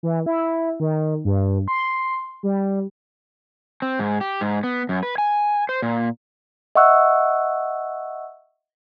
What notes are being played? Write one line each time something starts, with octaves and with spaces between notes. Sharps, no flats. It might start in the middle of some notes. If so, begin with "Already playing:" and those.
E3
E4
D#3
G2
C6
G3
C4
G#2
G4
G#2
B3
F#2
B4
G#5
C5
A#2
D#5 E5 F#5 C#6 E6 F#6